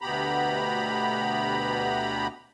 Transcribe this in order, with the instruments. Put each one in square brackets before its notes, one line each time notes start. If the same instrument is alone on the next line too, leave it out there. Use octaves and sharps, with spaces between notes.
[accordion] D2 B2 B3 G4 A#5 B5